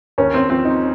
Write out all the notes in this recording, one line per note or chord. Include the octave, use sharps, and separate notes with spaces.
D#2 C#4
C4
F3 C4
D#4